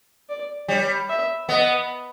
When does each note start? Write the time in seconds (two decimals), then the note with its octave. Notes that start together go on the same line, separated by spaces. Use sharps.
0.29 D5
0.68 G3 C#5
1.09 E5
1.49 B3 D#5